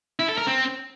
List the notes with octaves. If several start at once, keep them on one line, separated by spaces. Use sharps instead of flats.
E4
A4
A#4
C4